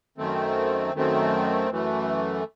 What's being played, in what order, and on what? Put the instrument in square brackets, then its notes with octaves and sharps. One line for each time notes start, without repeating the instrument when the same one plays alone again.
[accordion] F#2 D#3 A3 C4
F#2 D#3 A3 C4
F#2 E3 A3